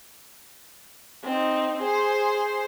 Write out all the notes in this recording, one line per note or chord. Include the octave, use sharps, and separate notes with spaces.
C4 D#4
G#4 C5